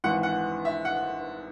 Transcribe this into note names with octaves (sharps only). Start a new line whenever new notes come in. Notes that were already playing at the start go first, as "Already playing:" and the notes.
G#1 G#2 E3 F#5
F#5
E5
F#5